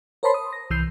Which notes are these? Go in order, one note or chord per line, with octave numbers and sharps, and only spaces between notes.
A#4 C5 C#5 A5 B5 C6
D#6
A#6
C2 E3 E6 G6 C7